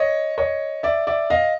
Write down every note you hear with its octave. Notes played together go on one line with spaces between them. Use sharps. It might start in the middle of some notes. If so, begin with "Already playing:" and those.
Already playing: C#5 D#5
C#5 D#5
D5 E5
D5 E5
D#5 F5